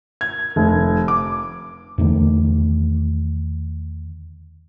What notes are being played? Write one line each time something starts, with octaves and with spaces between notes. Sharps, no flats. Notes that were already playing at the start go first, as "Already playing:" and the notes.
G#6
F1
D6
E2 D3 D#3 A3